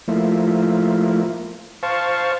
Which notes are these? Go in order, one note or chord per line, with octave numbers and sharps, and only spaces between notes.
F3 A3 A#3 E4
C5 F5 A5 C#6